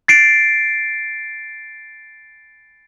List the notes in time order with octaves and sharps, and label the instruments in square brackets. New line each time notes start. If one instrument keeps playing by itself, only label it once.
[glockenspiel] A6 C7 D7